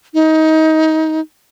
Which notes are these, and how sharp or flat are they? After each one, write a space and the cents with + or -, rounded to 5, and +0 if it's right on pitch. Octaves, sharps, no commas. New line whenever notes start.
D#4 +25